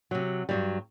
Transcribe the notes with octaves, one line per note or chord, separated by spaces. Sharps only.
C3 F#3
G2 F#3 G3